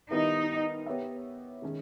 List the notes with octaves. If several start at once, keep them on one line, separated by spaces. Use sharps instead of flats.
D#3 G3 B3 D#4 E4 A#4
B3 G4 C#5 E5
D#3 G#3 C#4